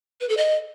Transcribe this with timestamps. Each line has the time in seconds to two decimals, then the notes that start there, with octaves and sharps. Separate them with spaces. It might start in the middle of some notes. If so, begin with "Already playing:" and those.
0.21 B4
0.29 A4
0.37 D#5